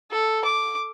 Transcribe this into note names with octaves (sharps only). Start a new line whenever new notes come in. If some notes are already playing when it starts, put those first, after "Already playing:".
A4
D6